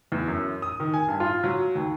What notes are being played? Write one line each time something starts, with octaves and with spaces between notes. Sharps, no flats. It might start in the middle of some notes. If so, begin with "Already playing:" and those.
E2
F#2
D#6
D#3
G#5
G2
F4
F#3
D#2